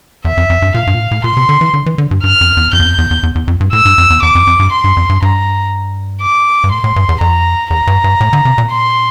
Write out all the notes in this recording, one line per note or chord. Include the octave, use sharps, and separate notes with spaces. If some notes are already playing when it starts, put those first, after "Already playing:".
E2 E5
F2
F2
G2
A#2 F5
G2
A#2
A2
A2
A#2 C6
C3
D3
E3
D3
E3
D3
G2
G2 F6
F2
E2
F2 G6
E2
F2
E2
E2
E2
E2
F2
G2
A2 E6
G2
F2
E2
E2 D6
F2
F2
G2
C6
G2
F2
G2
G2 A#5
D6
G2
A2 C6
A2
G2
E2
F2 A#5
E2 A#5
G2
G2
A2
D3
C3
A#2
C6